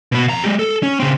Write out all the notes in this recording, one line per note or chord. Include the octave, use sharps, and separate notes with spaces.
B2 B3
F2 A#5
G#3 G4
A4
C#4
C#3 C4